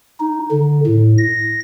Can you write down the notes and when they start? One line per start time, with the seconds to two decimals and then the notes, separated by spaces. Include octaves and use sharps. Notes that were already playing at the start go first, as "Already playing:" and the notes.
0.20 D#4
0.51 D3
0.86 A2
1.18 A#6